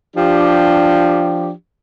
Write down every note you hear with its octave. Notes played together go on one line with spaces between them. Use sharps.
F3 D4 G4